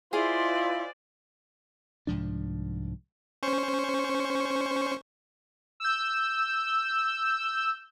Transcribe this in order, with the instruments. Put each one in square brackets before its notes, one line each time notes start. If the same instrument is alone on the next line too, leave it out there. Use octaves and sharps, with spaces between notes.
[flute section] E4 C6 [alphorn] F4 [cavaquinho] G#4 D#5 F5 [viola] C5 D5
[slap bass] C2 G#2 F3 D4
[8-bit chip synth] C#4 C5 C#6
[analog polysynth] E6 G6